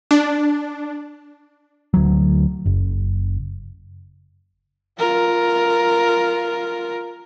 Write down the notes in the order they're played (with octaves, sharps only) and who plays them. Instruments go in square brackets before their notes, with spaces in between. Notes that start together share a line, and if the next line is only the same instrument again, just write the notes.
[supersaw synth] D4
[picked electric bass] D2 F#3
F#1
[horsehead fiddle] F4 A#4